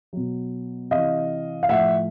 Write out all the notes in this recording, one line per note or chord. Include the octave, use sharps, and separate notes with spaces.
B2 F#3
C3 E3 D#5 F5
F5
A2 F3 E5 F#5